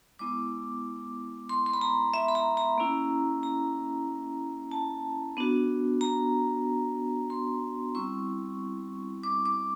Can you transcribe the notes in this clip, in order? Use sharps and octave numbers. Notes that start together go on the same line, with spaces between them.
G#3 B3 E4 D6
C6
C6
B5
A#5
E5
B5
A#5
A#5
A#3 C#4 E4
A#5
A5
B3 D4 F#4
A#5
C6
G3 C4 E4 C#6
D6
D6